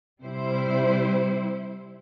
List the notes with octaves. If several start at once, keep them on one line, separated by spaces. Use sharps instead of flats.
C3 G3 E4 C5